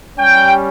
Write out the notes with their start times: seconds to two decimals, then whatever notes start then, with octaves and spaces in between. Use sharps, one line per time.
0.18 G3 C#4 G4 G5